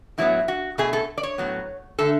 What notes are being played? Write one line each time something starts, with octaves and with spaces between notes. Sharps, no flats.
A2 F#3 B3 E4
F#4
B2 A3 G#4
A4
D5
C#5
A2 F#3 B3
D3 A3 A4